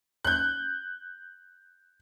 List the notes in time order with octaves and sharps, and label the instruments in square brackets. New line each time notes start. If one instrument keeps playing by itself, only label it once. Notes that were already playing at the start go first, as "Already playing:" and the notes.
[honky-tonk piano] F#6 G6